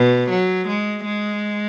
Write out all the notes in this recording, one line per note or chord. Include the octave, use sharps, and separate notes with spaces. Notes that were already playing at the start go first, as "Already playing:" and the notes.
Already playing: B2
F#3
G#3
G#3